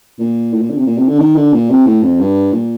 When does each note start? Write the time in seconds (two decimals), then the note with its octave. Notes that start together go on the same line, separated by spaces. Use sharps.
0.19 A#2
0.53 A2
0.61 A#2
0.70 D3
0.78 C3
0.87 A#2
0.97 C3
1.08 D3
1.19 D#3
1.36 D3
1.54 A#2
1.70 C3
1.87 A2
2.03 F2
2.20 G2
2.53 A#2